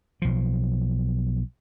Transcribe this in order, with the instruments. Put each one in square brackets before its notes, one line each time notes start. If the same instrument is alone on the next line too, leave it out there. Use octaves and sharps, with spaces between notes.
[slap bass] B1 F3